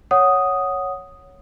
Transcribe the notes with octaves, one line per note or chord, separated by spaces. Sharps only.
C#5 F#5 D#6